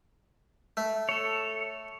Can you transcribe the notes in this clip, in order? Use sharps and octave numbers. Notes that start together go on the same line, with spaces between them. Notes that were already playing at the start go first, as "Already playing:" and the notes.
A3
A4 C#5